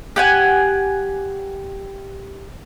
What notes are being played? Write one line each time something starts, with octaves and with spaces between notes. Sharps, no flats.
G4 F#5 G#5